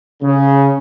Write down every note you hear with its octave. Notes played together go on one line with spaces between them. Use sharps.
C#3